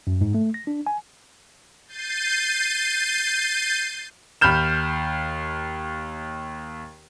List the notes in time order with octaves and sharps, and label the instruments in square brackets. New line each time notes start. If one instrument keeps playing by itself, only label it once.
[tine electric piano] F#2
G#2
A3
A#6
D4
G#5
[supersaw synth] G6 A6 C7 D#7
[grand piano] D#2 B5 F6 G6 E7